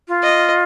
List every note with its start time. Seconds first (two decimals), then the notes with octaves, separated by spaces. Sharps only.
0.08 F4
0.23 D#5